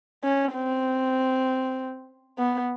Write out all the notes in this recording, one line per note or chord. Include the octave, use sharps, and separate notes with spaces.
C#4
C4
B3